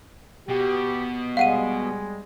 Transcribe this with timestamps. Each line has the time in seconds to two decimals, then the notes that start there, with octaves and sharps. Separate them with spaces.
0.49 B2 G4
1.37 G3 G#3 F5 F#5 D#7